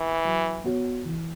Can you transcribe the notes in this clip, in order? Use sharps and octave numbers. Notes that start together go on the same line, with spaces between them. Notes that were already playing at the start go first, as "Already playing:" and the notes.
Already playing: E3
F#3
B3 F#4 C#5
E3